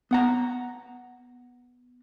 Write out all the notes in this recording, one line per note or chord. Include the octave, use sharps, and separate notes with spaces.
B3 F#5 A#5